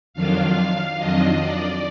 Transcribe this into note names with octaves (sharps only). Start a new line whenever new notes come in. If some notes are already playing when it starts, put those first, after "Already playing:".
F2 D#3 F#3 D4 F4 F5
F2 D#3 F#3 D4 F4 D#5
D5